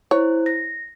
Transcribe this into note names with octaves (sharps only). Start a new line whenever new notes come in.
E4 C5 C#5
A#6